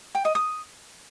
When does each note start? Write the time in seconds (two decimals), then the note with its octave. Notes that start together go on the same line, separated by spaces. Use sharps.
0.15 G5
0.25 D#5
0.35 D#6